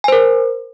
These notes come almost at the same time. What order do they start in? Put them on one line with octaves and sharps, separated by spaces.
G#5 C5 A#4